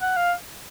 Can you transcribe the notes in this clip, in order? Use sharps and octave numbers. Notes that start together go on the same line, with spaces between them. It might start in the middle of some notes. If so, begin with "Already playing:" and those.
F#5
F5